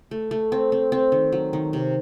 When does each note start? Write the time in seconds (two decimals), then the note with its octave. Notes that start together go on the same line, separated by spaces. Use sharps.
0.11 A3
0.31 A3
0.52 C4
0.72 C4
0.92 C4
1.12 D#3
1.32 F#3
1.53 D#3
1.73 C3